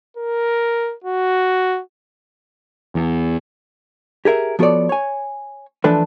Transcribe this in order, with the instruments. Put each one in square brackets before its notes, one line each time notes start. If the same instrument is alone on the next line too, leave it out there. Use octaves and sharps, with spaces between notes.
[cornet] A#4
F#4
[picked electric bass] E2
[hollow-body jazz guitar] G4 G#4 A#4 E5
F3 B3 F#4 A4 C#5 D5
C#5 G#5
E3 F3 A3 D4 A4 B4